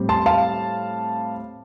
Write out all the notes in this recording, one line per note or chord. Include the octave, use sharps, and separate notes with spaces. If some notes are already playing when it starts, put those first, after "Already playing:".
Already playing: A2 G3 C4
A5 C6
F5 A5